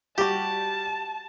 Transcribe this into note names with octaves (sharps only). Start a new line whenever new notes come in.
G3 F#4 G4 A5